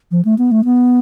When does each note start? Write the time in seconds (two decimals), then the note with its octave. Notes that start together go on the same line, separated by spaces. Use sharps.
0.11 F3
0.25 A3
0.38 B3
0.51 A3
0.65 B3